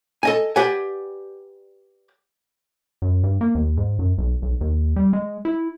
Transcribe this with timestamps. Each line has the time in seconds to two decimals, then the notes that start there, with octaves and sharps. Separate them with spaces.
0.23 A4 D#5 G#5
0.56 G4 B4 D5 F#5 G#5
3.02 F#2
3.24 G2
3.41 A#3
3.55 D#2
3.77 G#2
3.99 F#2
4.18 B1
4.42 B1
4.61 D#2
4.96 G3
5.13 G#3
5.45 E4